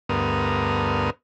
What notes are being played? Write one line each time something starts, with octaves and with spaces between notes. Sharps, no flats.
D2 G2 B3 A#4 D#6